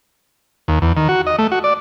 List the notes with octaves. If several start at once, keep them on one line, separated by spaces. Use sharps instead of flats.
D#2
E2
D#3
F#4
D#5
A3
F#4
D5